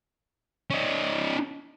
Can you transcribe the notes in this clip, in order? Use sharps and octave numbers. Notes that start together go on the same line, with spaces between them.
C#4 D#4